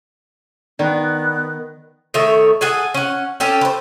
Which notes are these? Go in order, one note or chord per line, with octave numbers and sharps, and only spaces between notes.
D#3 B3 D5
D#3 A3 C#5 E5
G#4 A4 F#5 G#5
C#4 F#5
C#4 G4 A4
B4 C5